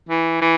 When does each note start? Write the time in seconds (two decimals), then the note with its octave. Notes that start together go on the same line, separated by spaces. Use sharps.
0.09 E3
0.41 E3